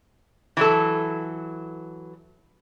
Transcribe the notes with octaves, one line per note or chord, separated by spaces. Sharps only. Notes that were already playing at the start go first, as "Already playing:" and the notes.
E3 F#3 A4